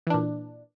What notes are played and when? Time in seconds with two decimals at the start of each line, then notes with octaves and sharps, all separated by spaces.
0.07 E3
0.10 D4
0.14 A#2